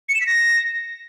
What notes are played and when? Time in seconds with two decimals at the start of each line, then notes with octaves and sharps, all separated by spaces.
0.09 C#7
0.15 E7
0.21 B6
0.26 A#6